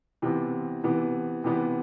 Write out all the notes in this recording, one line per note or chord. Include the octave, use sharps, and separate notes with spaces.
C3 E3 B3
C3 E3 B3
C3 E3 B3